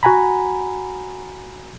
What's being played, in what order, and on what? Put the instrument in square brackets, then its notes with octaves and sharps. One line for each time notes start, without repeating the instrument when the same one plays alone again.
[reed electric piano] F#4 F#5 G#5 A#5 B5